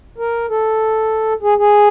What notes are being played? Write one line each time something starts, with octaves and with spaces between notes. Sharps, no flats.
A#4
A4
G#4
G#4